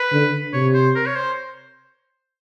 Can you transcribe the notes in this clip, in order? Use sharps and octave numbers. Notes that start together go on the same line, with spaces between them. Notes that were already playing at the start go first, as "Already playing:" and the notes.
Already playing: B4
D3
C3 C#5
C5
A#4
C#5
C5